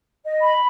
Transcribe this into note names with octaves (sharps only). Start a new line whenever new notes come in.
D#5
B5